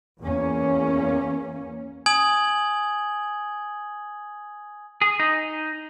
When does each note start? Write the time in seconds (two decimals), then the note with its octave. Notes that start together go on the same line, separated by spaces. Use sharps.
0.20 E2 A#3 C#4
2.06 G#5 D#6 G#6 F#7
5.02 G#4
5.20 D#4